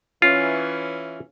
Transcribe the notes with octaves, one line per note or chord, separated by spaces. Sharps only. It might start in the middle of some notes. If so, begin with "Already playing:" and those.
E3 C#4 F4